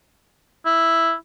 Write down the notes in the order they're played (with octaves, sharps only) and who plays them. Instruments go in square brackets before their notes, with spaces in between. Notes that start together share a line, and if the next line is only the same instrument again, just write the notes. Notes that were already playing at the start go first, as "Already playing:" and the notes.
[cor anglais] E4